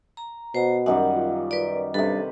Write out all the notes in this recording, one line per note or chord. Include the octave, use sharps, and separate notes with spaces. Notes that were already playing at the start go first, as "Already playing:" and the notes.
A#5
B2 C5 A#5
F#2 D#3 G3 F#5
F4
B4 D5
G2 C3 A4 B4